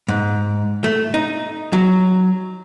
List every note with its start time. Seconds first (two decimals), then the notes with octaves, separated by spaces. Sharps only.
0.08 G#2
0.84 A3
1.14 D#4
1.73 F#3